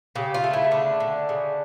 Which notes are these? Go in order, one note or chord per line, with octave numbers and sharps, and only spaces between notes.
C#3 G4
F4
A3
E4
D3 D4
D3
C#3